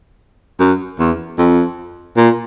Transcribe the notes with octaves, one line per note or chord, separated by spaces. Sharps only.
F#2
E2
F2
A#2